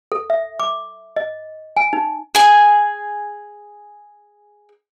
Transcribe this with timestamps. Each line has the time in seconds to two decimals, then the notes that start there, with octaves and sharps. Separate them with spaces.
0.12 A4
0.30 E5
0.60 D6
1.16 D#5
1.77 G#5
1.93 D#4
2.35 G#4 G#5